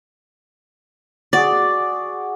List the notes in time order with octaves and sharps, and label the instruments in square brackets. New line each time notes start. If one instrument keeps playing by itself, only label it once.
[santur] F#4 G#4 [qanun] D5